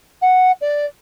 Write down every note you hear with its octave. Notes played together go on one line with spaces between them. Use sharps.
F#5
D5